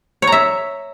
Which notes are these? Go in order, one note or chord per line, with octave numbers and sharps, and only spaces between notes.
C#5
A#5
E5